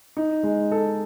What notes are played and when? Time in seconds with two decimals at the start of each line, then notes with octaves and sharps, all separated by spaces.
0.17 D#4
0.43 G#3
0.71 A4